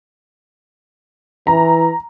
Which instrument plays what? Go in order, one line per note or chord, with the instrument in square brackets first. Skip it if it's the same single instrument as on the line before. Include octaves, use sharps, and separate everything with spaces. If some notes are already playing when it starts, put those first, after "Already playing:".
[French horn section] E3 [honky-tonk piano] A#5